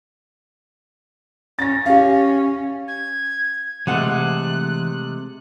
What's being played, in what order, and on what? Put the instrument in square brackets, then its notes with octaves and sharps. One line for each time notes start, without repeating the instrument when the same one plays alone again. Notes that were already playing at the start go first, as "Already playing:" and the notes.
[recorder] C#4 [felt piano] A6 A#6
[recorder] C#4 [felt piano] G4 F5
[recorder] G#6
[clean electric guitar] C3 G#3 A3 [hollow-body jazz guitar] E3 F#5 [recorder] F#6